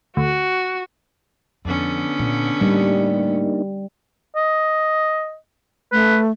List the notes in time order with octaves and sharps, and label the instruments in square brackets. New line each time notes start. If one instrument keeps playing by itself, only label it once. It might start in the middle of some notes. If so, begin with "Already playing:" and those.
[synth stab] D2 [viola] F#4
[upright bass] F2 [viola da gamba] D3 B3 C#4
[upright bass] A#2
[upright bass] A2 [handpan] G3 [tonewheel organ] A#3 D4 D#4
[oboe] D#5
[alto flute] A3 [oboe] B4